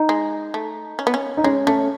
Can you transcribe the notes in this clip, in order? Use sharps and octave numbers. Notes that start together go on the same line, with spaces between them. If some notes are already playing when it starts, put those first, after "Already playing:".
Already playing: D#4
G#3
A3
C#4
B3
C#4
D#4
G#3 C#4
A3 C#4